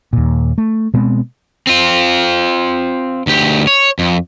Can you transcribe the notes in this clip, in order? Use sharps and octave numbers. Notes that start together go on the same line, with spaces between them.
D#2 A#2
A3
B2 G#3 B3 C4
C4 F4
D2 G4
C#5
F2